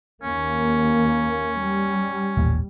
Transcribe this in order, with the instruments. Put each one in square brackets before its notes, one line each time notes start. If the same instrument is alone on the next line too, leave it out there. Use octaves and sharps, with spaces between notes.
[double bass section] D#2 A#3 [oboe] C#4
[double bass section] G3
[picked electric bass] D#1 A1 D#2